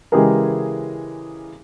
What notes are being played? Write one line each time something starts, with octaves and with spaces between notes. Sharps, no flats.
C#3 E3 G#3 G4 G#4 A#4